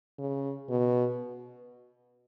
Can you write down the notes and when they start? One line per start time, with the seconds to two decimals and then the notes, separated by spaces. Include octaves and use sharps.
0.19 C#3
0.70 B2